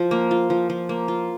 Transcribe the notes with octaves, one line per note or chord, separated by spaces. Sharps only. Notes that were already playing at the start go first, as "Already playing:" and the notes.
Already playing: F3 F4
A#3
F4
F3
F3
A#3
F4